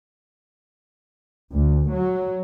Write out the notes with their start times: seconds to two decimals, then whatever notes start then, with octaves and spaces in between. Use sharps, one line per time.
1.53 D2
1.94 F#3